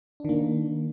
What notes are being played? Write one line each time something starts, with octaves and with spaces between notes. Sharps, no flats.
D#3 A#3 D4